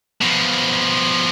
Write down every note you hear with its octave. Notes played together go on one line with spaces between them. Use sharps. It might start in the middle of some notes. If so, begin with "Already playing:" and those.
B2 F3